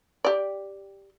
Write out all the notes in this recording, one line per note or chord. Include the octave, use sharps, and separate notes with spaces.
G4 D5